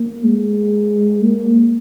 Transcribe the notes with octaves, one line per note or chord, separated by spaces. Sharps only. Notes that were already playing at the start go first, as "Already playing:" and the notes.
Already playing: A#3
G#3
A#3